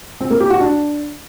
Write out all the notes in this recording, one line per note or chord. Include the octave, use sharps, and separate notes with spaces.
C4
A#3
G4
F#4
D4